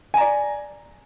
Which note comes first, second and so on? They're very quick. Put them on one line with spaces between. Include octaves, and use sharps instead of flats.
G#5 A#5 D5